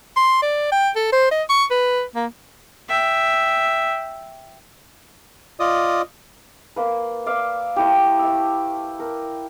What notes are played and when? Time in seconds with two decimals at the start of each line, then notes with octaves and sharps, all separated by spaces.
0.17 C6
0.42 D5
0.72 G5
0.96 A4
1.13 C5
1.31 D#5
1.49 C#6
1.71 B4
2.15 A#3
2.89 E5 G5
5.60 F4 D5 D#5 D#6
6.76 A#3 B4
7.26 D5 E5 F5
7.76 A3 E4 G4
8.19 E5 E6
9.00 A#4